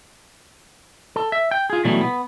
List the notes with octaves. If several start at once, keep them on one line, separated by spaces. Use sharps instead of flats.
A4
E5
G5
F4 G#4
B2 E3 F#3 G3 A3
B3